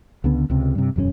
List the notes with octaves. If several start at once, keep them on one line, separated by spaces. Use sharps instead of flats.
C#2 D3 B3
C#2 C3
G2 C3
E1 F#2 F3 C#4